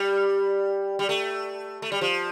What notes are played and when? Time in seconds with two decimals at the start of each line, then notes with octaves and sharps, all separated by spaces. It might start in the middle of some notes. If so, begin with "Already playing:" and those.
Already playing: G3
0.99 G3
1.09 A3
1.82 A3
1.92 G3
2.01 F3